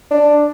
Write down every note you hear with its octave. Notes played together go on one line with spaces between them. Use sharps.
D4